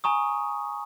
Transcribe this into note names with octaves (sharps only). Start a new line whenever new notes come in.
G#5 A#5 C#6 D#6